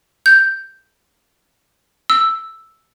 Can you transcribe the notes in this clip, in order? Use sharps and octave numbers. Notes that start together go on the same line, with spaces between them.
G6
E6